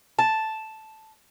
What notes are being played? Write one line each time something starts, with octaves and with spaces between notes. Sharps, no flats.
A5